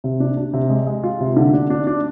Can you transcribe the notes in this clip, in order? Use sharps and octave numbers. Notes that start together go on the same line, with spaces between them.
C3
D4
D4
C3
G#3
G#3
F4
C3
D3
D4
D4
D4